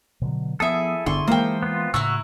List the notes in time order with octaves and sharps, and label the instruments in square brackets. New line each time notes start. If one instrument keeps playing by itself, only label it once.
[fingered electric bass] B2 D3 F#3
[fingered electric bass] F3 B3 [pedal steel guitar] E4 G#4 A4 [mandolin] E5 D#6
[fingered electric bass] G1 G2 B3 [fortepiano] D3 [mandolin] C6 C#6
[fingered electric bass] E3 G#3 [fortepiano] A#3 [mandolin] C5 G5
[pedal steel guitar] B3 F4
[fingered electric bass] A2 C#3 [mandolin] E4 A#5 C#6 [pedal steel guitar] F#4 E6